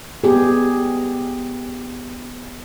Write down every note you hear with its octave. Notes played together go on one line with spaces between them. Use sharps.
B3 G4 G#4